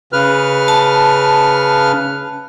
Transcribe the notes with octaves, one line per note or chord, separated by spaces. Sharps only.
C#3 B4 F6
A5